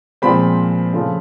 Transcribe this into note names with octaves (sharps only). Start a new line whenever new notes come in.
A#2 F3 G#3 C4 B5
C#3 F3 A3